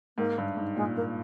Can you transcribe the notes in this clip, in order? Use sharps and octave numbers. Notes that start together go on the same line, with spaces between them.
G#2 A#3
G2
G#2
A#2 G#3
A#3